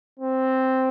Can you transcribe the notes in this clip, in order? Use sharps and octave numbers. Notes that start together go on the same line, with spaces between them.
C4